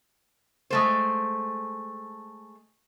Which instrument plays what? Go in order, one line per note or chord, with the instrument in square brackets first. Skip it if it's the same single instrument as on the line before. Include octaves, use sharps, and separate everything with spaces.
[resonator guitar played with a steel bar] G#3 A3 C5